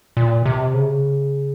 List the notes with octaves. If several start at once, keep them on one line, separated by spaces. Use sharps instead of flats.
A#2
C3
C#3